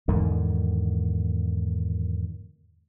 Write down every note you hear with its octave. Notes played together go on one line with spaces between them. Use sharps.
E2 G#2 D3 D#3